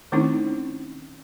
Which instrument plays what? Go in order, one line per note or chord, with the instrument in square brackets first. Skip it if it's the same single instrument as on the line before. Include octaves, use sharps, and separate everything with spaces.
[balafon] D#3 A3 C4 C#4 D#4 E4